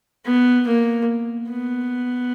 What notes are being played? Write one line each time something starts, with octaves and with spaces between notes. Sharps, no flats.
B3
A#3
B3